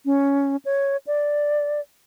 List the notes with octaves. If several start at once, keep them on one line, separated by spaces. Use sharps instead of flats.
C#4
C#5
D5